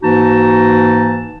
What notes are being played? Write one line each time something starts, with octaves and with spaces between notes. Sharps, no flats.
G#2 E3 A#3 D#4 F#4 A5